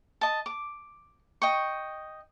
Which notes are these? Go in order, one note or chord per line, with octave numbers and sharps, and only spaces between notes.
D#5 A5
D6
D#5 G5 C#6